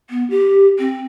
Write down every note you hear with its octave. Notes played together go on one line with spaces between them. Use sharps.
B3
G4
C4